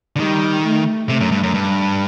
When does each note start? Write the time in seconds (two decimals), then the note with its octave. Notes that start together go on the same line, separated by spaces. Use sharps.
0.16 D3
0.20 D#3 G3
0.65 A3
1.09 C3 A3
1.21 F#2
1.32 G2
1.43 F#2
1.54 G2